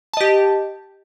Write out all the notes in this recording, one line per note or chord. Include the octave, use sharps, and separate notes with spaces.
G4 D#5 A5